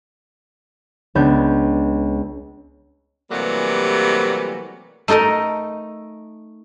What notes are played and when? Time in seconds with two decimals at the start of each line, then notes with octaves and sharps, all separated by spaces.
1.15 C#2 B3 D4 G6
3.31 C3 E3 F#3 G3 A3 A#3
5.08 A3 D#4 A4 A#4 D#5